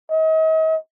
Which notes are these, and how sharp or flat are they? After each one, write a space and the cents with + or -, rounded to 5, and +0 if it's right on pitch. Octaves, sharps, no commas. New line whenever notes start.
D#5 +40